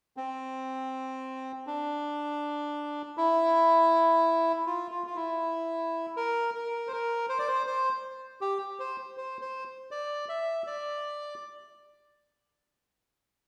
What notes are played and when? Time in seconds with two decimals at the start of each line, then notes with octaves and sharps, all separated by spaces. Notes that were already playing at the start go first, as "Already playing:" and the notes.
0.17 C4
1.67 D4
3.17 E4
4.67 F4
4.91 F4
5.07 F4
5.16 E4
6.17 A#4
6.55 A#4
6.87 C5
6.92 A#4
7.29 C5
7.39 D5
7.48 C5
7.67 C5
8.41 G4
8.80 C5
9.17 C5
9.41 C5
9.91 D5
10.29 E5
10.67 D5